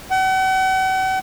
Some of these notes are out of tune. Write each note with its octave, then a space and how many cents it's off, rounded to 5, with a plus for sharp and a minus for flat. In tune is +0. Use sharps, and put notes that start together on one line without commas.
F#5 +40